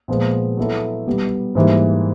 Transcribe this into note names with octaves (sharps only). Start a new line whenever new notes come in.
A#2 F3 G#3 B3
F#3 B3 E4 A4
B2 G3 B3
G#2 E3 G3 A#3